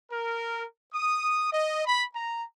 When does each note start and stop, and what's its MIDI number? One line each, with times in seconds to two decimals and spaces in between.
0.11 0.64 70
0.93 1.47 87
1.52 1.83 75
1.85 2.02 83
2.14 2.42 82